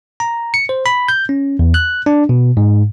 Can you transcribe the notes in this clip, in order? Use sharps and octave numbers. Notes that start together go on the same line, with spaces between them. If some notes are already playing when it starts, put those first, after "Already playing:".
A#5
C#7
C5
B5
G6
C#4
E2
F#6
D4
B2
G#2